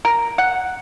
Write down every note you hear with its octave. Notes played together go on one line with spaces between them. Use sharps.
A#4
F#5